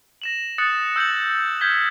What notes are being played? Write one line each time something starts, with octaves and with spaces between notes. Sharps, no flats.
A#6 E7 F#7
D#6 F#6 A6 C#7 F#7
E6 G6 C#7 E7 F#7
F6 G6 G#6 B6 E7 G7